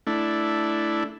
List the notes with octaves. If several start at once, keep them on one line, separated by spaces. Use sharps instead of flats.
A3 D4 E4